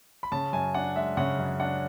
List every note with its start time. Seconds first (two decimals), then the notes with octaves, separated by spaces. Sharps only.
0.23 B5
0.32 C#3 A5
0.53 F#2 G#5
0.74 D4 F#5
0.96 G#3 E5
1.17 C#3 F#5
1.39 F#2
1.60 D4 F#5